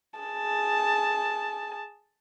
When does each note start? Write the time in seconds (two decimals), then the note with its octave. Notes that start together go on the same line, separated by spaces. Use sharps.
0.20 G#4 A5